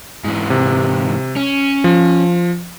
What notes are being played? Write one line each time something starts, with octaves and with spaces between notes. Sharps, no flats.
G#2 E3
C3
C#4
F3